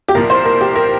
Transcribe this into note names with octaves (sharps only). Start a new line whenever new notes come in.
G4
C2 A#2 F3 A#4
C5
A#4
G4
A#4